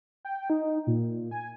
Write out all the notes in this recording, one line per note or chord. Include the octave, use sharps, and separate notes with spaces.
G5
D#4
A#2
G#5